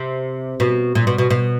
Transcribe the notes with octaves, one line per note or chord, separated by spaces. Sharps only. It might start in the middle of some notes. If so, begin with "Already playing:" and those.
Already playing: C3
B2
A#2
B2
B2
B2